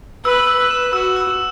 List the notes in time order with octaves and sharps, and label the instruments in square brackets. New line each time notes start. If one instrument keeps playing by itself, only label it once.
[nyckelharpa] B4 [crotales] E6
[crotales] E6
[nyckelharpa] B4
[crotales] E7
[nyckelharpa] F#4 [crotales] E6
[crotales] E6